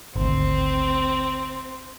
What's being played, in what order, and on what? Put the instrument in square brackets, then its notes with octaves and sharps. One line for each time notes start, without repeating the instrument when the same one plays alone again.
[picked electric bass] G#1 D2 [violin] C4